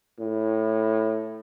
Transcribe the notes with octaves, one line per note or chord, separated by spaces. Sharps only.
A2